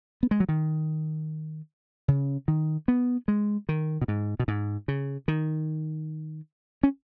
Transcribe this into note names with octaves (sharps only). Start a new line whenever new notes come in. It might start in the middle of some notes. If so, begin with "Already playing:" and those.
B3
G#3
F#3
D#3
C#3
D#3
B3
G#3
D#3
B2
G#2
B2
G#2
C#3
D#3
C#4